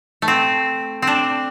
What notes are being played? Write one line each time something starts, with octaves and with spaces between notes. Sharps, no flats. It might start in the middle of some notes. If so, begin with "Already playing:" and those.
A3
C4
C4 D4